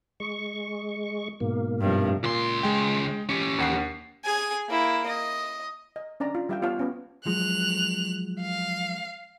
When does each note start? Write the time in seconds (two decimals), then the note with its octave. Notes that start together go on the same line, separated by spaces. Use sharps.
0.20 G#3 C#6
1.40 G#2 B2 A#3
1.81 G2 C3 F3
2.24 C#2 A#2 C6
2.63 G#3 G5
3.29 C#4 G4 C#7
3.58 D#2 F#5 C7
4.24 G#4 G#5
4.68 A#3 E4
5.06 D#5
5.96 D#5
6.20 C#4 D4 D5 A#5
6.35 F4
6.49 G3 G4 E5 F5 G5
6.62 B3 F4 C#5 F5 A5
6.79 B3 C#4
7.26 F3 F#3 G#3 F#6 F7
8.41 F5